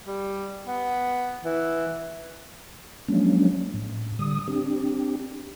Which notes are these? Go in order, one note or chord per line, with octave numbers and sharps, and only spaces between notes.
G3
B3
E3
F3 F#3 G#3 A#3 C#4 D4
A2
D3 G3 D#6
C4 D4 G4